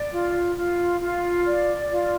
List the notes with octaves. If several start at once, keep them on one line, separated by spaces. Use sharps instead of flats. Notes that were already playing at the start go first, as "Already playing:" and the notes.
Already playing: D5
F4
F4
F4
D5
F4